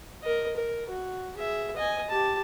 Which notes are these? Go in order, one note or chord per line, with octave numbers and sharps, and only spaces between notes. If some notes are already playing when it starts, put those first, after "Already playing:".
A#4 D#5
A#4
F#4
G#4 E5
D#5 G#5
G4 A5